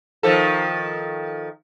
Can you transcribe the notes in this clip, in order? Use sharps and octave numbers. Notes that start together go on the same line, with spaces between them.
D#3 F3 A4